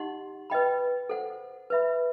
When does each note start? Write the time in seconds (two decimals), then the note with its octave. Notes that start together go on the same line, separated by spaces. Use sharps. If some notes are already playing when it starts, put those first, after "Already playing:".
Already playing: D#4 G4 D#5 F#5 C6
0.50 B4 D#5 G5 B5
1.09 A4 C5 F#5
1.70 B4 E5 B5